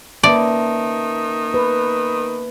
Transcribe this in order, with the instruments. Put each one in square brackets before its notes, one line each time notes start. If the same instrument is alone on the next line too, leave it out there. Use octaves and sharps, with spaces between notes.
[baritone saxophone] D#3 [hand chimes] A#3 E5 A5 [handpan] C#4 B4 [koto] D5
[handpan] B4